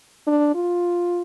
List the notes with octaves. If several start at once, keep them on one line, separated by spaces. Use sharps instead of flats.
D4
F4